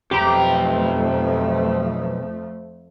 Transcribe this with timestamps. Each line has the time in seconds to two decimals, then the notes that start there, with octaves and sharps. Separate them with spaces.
0.11 B1 F2 F3 A3 G4 A#5